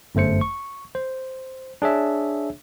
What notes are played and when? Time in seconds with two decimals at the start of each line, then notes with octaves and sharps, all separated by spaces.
0.15 G1 F#2 A3 C5 C#7
0.41 C#6
0.95 C5
1.82 D4 G#4 C#5 E5